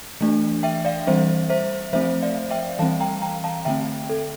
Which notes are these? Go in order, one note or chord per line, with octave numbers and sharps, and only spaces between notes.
E3 A3 D4
E5 G5
D5 F5
E3 G3 C4 C5 E5
C5 E5
F3 A3 C4 C5 E5
D5 F5
E5 G5
E3 G3 C4 F5 A5
G5 A#5
G5 A#5
F5 A5
D3 A3 C4 E5 G5
A4